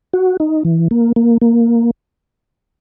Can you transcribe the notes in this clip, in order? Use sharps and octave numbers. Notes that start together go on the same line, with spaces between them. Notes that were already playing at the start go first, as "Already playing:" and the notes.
F#4
D#4
E3
A#3
A#3
A#3